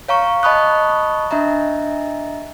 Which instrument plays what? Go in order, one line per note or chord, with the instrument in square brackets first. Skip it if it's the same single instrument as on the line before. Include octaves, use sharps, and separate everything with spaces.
[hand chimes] C#5 F5 A#5 C#6
D#5 A5 B5 C#6 D#6 F#6
D4 D#5 E5 A#5